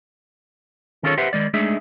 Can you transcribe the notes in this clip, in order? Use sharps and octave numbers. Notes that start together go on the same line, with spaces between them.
D#3 C#4 F4 G#4 A4 C#5
G4 B4 C5 E5 F#5
D#3 G#3 D5
G#3 A3 D4 D#4 G#4 E5